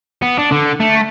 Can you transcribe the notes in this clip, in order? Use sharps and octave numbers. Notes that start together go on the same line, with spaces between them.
B3
D4
D3
A3